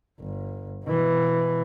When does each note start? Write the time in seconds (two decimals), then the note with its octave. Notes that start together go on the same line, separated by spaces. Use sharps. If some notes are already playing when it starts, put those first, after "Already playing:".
0.19 G1
0.85 B2 E3